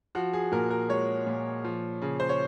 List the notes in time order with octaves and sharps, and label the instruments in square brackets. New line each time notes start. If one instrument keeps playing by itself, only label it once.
[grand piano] F3 F#4
G#4
A#2 A#4
A#4
G#3 C#5
A#2
F3
C#3
C5
C#5